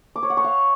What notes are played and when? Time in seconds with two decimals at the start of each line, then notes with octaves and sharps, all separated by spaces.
0.16 D6
0.23 C#5
0.30 F#5
0.37 C#6
0.44 F5